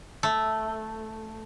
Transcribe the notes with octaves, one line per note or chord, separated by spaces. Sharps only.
A3